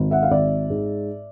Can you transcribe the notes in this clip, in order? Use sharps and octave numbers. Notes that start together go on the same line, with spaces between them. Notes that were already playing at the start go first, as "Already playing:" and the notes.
Already playing: G#1
E5 F#5
F5
G#1 D5 E5
G#2